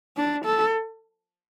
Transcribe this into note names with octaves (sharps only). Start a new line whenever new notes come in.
D4
A4